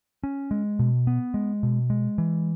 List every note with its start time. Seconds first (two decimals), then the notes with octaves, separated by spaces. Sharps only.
0.24 C#4
0.51 G#3
0.79 B2
1.07 B3
1.34 G#3
1.63 B2
1.90 G#3
2.18 E3